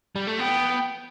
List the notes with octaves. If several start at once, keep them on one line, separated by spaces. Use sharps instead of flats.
G3
A3
B3 G5